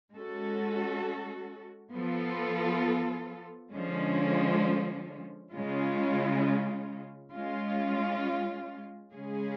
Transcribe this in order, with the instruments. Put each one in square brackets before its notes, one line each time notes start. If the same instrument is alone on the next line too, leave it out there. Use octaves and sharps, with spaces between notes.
[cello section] G#3 C#4 F#4 A4
F3 B3 F4 A4
D3 F3 G#3 C#4
C#3 G#3 C#4 F4
G#3 C#4 F4
C#3 G#3 C#4 G#4